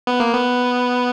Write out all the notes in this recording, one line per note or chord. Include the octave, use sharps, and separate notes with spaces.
B3
A#3
B3